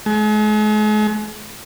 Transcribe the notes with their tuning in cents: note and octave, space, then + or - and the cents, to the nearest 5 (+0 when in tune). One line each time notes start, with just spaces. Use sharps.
G#3 +40